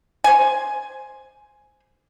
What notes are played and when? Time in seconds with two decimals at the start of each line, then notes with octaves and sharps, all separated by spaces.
0.24 C5 G#5